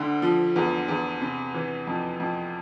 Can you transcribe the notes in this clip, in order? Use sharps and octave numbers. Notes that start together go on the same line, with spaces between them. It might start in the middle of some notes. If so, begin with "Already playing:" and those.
Already playing: D2 D3
F3
E2
E2
C3
E3
F2
F2